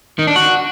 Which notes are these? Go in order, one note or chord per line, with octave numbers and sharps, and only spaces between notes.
D#3
D4
F#4